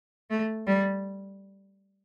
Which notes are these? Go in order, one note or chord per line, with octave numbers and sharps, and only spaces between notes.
A3
G3